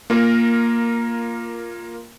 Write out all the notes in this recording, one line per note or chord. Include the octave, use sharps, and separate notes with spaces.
A#3 F4 A#4